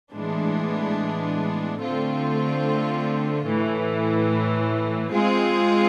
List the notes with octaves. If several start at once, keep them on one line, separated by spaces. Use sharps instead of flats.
A2 E3 G#3 B3 D4
D3 A3 C4 F4
A2 E3 A3
G#3 C4 F4 G#4